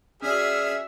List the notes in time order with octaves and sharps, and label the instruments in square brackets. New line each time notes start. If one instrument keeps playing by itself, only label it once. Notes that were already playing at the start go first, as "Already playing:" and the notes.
[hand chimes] C#4 D5 [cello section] F#4 E5 [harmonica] G#4 [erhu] F6